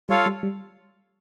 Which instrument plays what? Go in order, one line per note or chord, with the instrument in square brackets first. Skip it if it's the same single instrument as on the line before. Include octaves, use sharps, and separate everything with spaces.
[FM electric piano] G3 [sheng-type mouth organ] F4 A4 C#5 F5
[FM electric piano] G3
G3